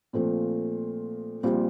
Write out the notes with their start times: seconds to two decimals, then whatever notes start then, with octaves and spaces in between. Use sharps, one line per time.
0.13 A#2 F3 A3 C4
1.43 A#1 A#2 G3 C4